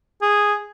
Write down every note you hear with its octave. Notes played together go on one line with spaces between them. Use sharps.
G#4